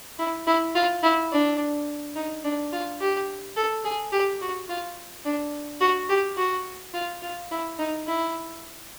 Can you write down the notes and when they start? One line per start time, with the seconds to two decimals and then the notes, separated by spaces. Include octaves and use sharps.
0.19 E4
0.47 E4
0.75 F4
1.03 E4
1.32 D4
2.16 D#4
2.44 D4
2.73 F4
3.01 G4
3.56 A4
3.85 G#4
4.12 G4
4.41 F#4
4.69 F4
5.25 D4
5.81 F#4
6.09 G4
6.37 F#4
6.94 F4
7.22 F4
7.51 E4
7.79 D#4
8.07 E4